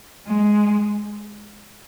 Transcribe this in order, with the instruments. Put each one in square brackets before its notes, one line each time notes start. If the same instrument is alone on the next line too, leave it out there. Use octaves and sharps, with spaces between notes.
[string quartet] G#3